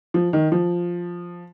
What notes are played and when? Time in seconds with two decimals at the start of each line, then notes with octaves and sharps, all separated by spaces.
0.14 F3
0.33 D#3
0.52 F3